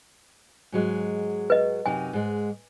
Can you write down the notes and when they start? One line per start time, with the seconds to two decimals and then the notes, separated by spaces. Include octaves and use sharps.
0.72 G#2 F#3 G#3
1.50 B4 D#5
1.86 F#2 C3 D#4 G#5
2.13 G#2 G#3